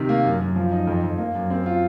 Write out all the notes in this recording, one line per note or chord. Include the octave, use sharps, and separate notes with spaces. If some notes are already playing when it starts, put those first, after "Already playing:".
Already playing: C3 D#3
A#3
F#2
F#2
F3
D#4
F2
F2
A#3
F#2
C4
F4